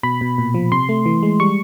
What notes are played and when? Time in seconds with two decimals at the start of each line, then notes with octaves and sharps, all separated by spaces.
0.03 B2 B5
0.21 B2
0.38 A#2
0.54 F3
0.72 C3 C6
0.89 A3
1.06 E3
1.23 G#3
1.40 G3 C#6